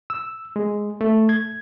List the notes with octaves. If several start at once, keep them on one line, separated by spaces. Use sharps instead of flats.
E6
G#3
A3
G#6